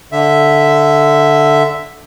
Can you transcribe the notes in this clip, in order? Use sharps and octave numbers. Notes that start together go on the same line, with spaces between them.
D3 E5